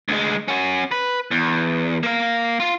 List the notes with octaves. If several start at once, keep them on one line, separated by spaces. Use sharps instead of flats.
D2 G#3
C#4 F#4
B4
E2
A#3 F5
F4